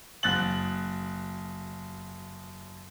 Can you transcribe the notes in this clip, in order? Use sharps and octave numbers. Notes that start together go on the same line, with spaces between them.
F#1 F#6 A6 F#7